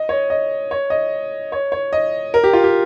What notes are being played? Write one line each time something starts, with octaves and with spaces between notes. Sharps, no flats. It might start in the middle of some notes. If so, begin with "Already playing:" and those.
Already playing: D#5
C#5
D#5
C#5
D#5
C#5
C#5
D#5
A#4
G4
F4
G4